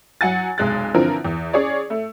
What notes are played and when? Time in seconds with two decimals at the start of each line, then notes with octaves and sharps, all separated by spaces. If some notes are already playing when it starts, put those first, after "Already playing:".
0.21 F#3 F#5 G#5 A6
0.58 F1 B1 G#3 F#6 A6
0.94 D3 E3 F3 C4 A#4
1.25 E2
1.53 C#4 G#4 C#5 D5
1.90 A3